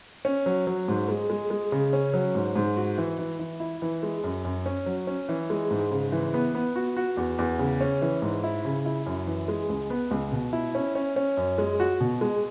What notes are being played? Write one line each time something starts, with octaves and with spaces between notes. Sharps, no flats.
C#4
F#3
F#3
G#2
G#3
G#3
G#3
C#3
C#4
F#3
G#2
G#2
F#4
E3
E3
E3
E4
E3
G#3
F#2
F#2
C#4
F#3
C#4
E3
G#3
G#2
C#3
E3
B3
B3
F#4
F#4
E2
E2
C#3
C#4
E3
G#2
E4
C#3
E4
F#2
E3
G#3
C#2
B3
C#2
B2
E4
C#4
C#4
C#4
F#2
G#3
F#4
B2
G#3